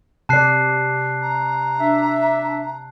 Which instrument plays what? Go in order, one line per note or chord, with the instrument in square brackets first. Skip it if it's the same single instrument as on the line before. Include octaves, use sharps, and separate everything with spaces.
[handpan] C3 D5 [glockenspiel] A5 F#6 C7
[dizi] A#5
[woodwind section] D4 E5